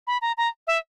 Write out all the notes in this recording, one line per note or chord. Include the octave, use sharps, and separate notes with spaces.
B5
A#5
A#5
E5